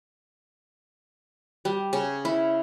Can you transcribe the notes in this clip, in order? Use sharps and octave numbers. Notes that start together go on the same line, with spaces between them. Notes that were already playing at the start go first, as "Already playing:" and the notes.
G3
C#3
E4